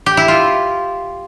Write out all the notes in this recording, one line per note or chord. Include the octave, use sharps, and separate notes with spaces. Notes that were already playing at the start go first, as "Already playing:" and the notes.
G4
E4
F4